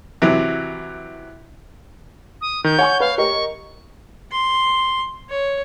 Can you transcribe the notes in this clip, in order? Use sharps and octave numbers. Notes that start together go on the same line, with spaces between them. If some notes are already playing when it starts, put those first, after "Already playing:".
C3 E3 F#3
D#6
D#3 G6
C#5 F#5 G#5 C#6
B4 F5
G4 A#4 D#5 C#6
C6
C#5